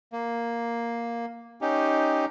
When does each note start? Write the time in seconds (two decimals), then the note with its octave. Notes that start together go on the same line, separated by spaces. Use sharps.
0.13 A#3
1.61 C#4 D#4 G4